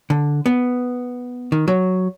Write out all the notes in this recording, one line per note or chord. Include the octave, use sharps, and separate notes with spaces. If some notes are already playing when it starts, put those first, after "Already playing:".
D3
B3
D#3
F#3